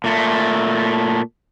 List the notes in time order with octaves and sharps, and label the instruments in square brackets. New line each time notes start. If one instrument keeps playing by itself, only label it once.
[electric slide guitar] A#2 A3